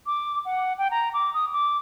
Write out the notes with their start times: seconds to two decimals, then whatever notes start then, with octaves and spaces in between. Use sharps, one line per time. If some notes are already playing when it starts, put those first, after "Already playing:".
0.06 D6
0.45 F#5
0.78 G5
0.91 A#5
1.14 D6
1.34 D#6
1.53 D6